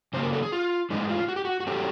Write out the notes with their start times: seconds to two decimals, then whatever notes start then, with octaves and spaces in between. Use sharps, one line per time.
0.13 C#3 F#3 A#3 C5
0.23 A#4
0.33 A4
0.43 G#4
0.52 F4
0.90 A2 E3 G#3 D#4
1.09 F4
1.28 F#4
1.36 G4
1.45 F#4
1.60 F#4
1.67 A2 F#3 A3 C4 G4